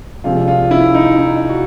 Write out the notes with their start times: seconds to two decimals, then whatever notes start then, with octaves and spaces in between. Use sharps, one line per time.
0.24 C2 C3 F3 G#3 F4
0.48 F4
0.71 E4
0.95 D#4
1.18 D#4
1.49 F#4